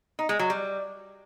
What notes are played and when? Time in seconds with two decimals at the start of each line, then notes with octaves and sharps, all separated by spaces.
0.19 D#4
0.29 G#3
0.39 F#3
0.50 G3